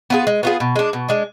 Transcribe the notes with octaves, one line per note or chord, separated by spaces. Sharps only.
B3 F4 G#4
G#3
B3 F4 G#4
B2
G#3 D4
B2
G#3 D4